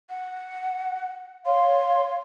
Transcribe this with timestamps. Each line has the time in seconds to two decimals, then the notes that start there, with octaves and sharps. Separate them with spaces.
0.10 F#5
1.46 C#5 F5 C6